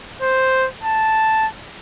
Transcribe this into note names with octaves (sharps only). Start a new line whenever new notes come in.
C5
A5